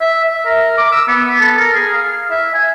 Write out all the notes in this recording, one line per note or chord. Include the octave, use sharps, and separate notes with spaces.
E5
E5
A#4
D6
E6
B3
A4
A#4
G#4
F5
E5
G#5